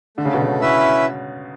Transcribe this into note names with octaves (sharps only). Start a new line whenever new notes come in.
D3 A3
C#3
B2
C#3
C#4 E4 B4 E5